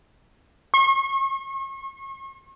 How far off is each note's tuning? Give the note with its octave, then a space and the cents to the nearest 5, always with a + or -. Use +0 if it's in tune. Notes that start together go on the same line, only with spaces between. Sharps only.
C#6 -40